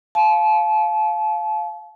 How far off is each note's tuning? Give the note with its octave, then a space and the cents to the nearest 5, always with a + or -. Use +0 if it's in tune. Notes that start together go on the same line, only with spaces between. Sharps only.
F5 +0 A5 -35